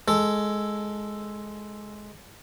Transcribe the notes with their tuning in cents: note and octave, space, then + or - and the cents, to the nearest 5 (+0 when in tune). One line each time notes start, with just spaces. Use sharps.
G#3 +10 A4 +0